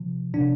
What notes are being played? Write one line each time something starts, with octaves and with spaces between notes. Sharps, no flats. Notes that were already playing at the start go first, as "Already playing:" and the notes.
Already playing: C3 F3
C3 D4